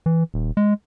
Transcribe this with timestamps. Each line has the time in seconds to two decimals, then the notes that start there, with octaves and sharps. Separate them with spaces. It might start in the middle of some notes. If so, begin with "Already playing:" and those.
0.06 E3
0.34 D#1
0.57 G#3